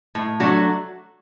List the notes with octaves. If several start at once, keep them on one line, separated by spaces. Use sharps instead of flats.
A2
F#3 A3 D4 F#4